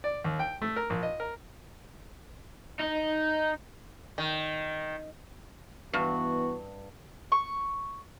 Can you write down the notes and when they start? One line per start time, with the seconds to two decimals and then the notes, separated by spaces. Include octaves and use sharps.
0.04 D5
0.24 D#2
0.39 G5
0.62 A3
0.76 A#4
0.90 A#1
1.03 D#5
1.20 A#4
2.79 D#4
4.18 D#3
5.93 G2 E3 B3 F#4
7.32 C#6